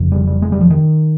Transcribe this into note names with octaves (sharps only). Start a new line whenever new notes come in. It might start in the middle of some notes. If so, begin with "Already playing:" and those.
Already playing: F1 F2 C#3
G3
G3
G#3
G3
F3
D#3